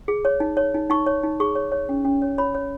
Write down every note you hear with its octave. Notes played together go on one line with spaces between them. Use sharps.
G#4
C#5
D#4
C#5
D#4
D#4 C#6
C#5
D#4
G#4 C#6
C#5
C#5
C#4
C#4
C#5
C#5 B5
C#5